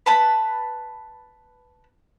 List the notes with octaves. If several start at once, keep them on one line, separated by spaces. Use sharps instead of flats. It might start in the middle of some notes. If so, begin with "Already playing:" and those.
B4 A5 B5